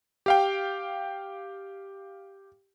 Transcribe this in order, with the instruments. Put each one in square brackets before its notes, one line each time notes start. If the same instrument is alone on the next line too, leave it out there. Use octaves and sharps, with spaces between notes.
[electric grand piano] G4 F5 G5